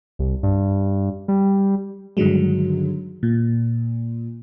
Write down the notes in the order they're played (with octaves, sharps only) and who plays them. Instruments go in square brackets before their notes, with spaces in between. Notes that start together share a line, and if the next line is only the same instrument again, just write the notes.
[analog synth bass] C2
G2
G3
[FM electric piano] G2 D3 D#3 F#3 G#3
A#2